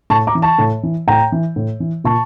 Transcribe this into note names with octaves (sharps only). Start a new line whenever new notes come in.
A2 A5 C#6
A#5 D6
E3
A5 C#6
A2
E3
A2 G5 A#5
E3
A2
E3
A#2 A5 C#6